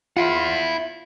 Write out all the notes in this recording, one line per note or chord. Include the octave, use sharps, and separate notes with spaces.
E4 F4 F#5